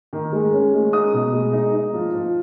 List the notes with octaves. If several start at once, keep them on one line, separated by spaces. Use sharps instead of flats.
D#3
G#3
C#4
G#3
D#4 D#6
B2
G#3
D#4
D#4
F3
F3